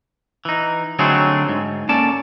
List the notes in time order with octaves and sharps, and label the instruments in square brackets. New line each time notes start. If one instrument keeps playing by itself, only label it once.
[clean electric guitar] E3 D#4
D3 F#3 A3 C4 D#4 G#4
G#2
A#3 C#4 A4 D5 A5